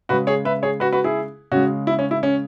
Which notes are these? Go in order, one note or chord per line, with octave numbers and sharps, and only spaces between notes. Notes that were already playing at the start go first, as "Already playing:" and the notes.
C#3 G#3 F#4 B4
G#4 C#5
B4 E5
G#4 C#5
F#4 B4
F#4 B4
E4 G#4
C#3 G#3 C#4 F#4
E4
C#4
E4
C#4